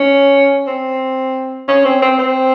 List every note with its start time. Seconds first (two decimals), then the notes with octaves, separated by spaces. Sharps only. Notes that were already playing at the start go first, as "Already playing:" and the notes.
Already playing: C#4
0.67 C4
1.68 C#4
1.85 C4
2.02 C4
2.19 C4